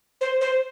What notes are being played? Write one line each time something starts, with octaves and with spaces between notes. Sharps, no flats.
C5
C5